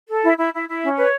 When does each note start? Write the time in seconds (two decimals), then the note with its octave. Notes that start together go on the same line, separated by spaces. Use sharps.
0.08 A4
0.23 E4
0.37 E4
0.53 E4
0.68 E4
0.83 C#4
0.97 B4 C#5